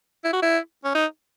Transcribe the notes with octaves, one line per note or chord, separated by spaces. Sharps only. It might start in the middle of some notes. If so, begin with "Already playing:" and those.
E4
F#4
E4
C#4
D#4